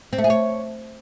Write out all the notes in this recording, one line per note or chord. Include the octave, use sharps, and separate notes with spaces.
C4
A3
G#4
C#5